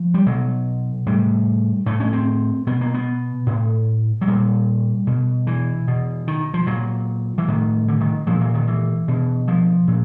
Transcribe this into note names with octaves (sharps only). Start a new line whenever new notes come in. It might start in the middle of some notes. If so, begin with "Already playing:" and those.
Already playing: F3
G3
B2 F#3
A2 G3
A2 A3
C#4
C4
B2 B3
A#3
B3
A2
F#3
A#2 G3
B2
E3
B2
D#3
F3
A#2 F#3
E3
A2 D#3
D3
D#3
A#2 F3
E3
D#3
E3
B2
F3
A#2